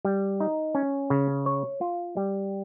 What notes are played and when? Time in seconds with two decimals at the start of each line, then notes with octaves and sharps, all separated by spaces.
0.05 G3
0.40 D#4
0.75 C#4
1.10 C#3
1.46 C#5
1.81 F4
2.17 G3